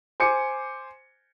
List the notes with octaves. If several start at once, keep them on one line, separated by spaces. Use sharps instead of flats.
C5 G#5 D6 C#7